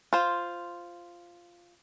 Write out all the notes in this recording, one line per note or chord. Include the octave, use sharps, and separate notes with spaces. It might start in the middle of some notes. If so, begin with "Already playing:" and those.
F4 C5